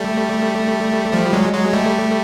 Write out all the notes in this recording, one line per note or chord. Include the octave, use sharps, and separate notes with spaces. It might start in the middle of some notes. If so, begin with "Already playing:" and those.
Already playing: G3 A3
F3 G3
F#3 G#3
F#3 G#3
G3 A3